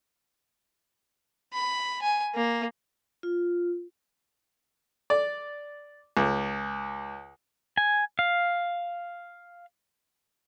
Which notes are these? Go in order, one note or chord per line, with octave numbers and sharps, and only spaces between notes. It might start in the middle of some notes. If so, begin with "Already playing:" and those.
B5
G#5
A#3
F4
D5
C#2
G#5
F5